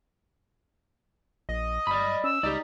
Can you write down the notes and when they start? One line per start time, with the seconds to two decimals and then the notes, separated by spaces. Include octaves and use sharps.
1.49 A#1 D#5
1.87 G1 D5 B5
2.24 C#4 E6
2.43 C#2 D#4 G4 D5